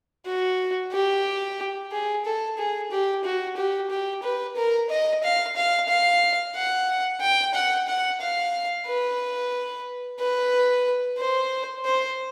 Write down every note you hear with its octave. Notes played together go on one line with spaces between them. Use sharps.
F#4
G4
G#4
A4
G#4
G4
F#4
G4
G4
B4
A#4
D#5
F5
F5
F5
F#5
G5
F#5
F#5
F5
B4
B4
C5
C5